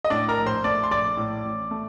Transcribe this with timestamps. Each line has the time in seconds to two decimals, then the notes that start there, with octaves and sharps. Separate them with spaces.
0.05 D#5
0.10 A2 D4 D5
0.28 A#4 A#5
0.38 A#1
0.46 C5 C6
0.64 A3 D5 D6
0.83 C6
0.91 A#1 D5 D6
1.17 A2
1.44 A1
1.71 A3